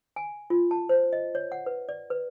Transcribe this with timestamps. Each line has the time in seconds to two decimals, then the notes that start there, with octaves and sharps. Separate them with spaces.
0.16 G#5
0.50 F4
0.71 A5
0.89 C5
1.13 D#5
1.35 C#5
1.52 F#5
1.66 B4
1.89 D5
2.10 B4